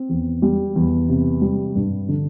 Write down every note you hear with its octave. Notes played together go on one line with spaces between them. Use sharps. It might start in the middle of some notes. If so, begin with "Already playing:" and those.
Already playing: C4
E2
G3
E2
C3
G3
G2
D3